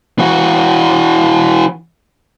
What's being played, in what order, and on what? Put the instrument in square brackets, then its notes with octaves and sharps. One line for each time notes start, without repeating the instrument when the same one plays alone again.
[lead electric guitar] E3 F#4